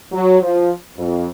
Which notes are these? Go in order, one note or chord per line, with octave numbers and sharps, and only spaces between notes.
F#3
F3
F2